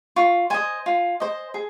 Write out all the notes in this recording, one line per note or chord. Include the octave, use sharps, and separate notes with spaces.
F4 C#6
C5 D#5 G#5
F4
C5 D#5
G#4